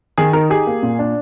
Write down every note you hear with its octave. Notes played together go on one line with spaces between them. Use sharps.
D#3 G#4
D#4 A#4
G4 G#4
A#3
A#2
D4